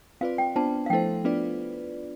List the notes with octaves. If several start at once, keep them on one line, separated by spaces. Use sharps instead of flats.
C4 F4 B4 D5 F5
G5
B3 D4 F4 C5 A5
F5
F3 A3 E4 A4 C5 G5
B3 D4 F4 B4 D5